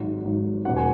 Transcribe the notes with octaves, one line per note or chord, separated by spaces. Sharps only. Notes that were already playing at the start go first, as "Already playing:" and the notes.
Already playing: G#1 G#2 F#3
G#1 G#2 F#3
E1 D#2 C#3 F#3 F#5
G#5